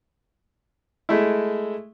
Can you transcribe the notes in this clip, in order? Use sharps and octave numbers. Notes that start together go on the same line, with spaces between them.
G#3 A3 E4